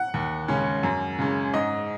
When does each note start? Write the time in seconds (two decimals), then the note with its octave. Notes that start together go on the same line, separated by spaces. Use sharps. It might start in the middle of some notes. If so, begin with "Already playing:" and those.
Already playing: F#5
0.14 D#2
0.48 C#3 G#3 C#4
0.83 F#2
1.19 C#3 G#3 C#4
1.53 G#2 D#5